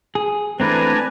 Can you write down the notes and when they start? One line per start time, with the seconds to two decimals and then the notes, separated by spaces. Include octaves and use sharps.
0.15 G#4
0.60 E3 A3 C4 D4 B4 G#5 A#5